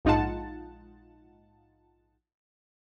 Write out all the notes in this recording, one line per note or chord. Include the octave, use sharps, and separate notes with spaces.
A#1 G#2 D#4 F4 F#5 A5